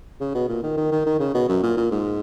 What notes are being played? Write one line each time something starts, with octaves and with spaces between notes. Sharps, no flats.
C#3
B2
A#2
D#3
D#3
D#3
D#3
C#3
B2
F#2
A#2
A#2
G#2